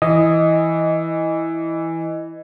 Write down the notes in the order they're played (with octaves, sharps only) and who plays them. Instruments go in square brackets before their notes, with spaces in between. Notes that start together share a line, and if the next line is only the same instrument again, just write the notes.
[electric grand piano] E3 [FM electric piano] D#5